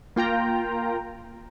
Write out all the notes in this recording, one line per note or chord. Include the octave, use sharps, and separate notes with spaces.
A#3 F4 G5 A#5